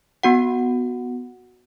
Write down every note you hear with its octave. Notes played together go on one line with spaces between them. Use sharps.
B3 F#4 F#5